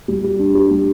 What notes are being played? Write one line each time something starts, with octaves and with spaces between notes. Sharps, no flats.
G3
G4
D4
G4
G3